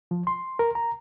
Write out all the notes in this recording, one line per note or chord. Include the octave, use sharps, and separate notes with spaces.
F3
C6
A#4
A#5